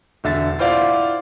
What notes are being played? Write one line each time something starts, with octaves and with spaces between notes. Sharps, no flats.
E1 D3 E5 A6
E4 F4 C5 D5 F5 F#5